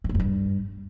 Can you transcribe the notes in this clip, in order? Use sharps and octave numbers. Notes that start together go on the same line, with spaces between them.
G#2
A2
F#2
G2